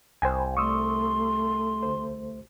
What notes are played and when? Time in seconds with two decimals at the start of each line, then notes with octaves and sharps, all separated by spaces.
0.22 C2 C5 G5 G#5
0.57 A3 C6 C#6 D#6 E6
1.83 D2 C5